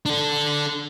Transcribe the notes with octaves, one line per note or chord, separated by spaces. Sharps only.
D4 A4